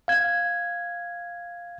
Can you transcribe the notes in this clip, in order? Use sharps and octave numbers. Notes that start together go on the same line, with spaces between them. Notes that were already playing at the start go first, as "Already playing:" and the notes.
F5 G#6